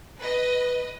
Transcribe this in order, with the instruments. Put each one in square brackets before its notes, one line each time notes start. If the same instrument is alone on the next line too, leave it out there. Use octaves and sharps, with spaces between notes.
[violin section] B4 D#5